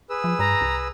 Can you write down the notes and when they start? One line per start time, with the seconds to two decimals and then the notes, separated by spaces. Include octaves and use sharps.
0.10 G#4 B4 E6
0.24 F3
0.39 G2 A#5
0.61 C2